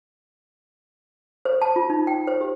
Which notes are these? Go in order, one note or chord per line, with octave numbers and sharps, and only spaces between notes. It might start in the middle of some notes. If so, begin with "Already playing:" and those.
C5
A5
F4
D#4
G5
C5
G4